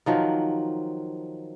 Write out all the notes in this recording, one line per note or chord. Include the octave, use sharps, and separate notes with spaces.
D#3 F3 F#3